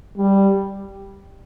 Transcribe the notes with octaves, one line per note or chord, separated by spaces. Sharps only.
G3